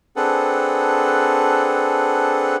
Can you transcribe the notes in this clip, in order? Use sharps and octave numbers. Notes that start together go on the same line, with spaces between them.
C4 D4 G#4 A4 B4 F#5